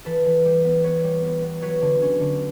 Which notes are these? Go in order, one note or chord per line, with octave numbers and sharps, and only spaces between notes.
E3 A4 B4
E3
G3
B3
B3 B4 C#5
G3
B3
B3
F#3 B4 C#5
D3
C#4
D3